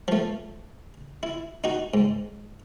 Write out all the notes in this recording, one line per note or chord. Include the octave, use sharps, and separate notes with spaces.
F3 A3
E4
D#4 F#4
G#2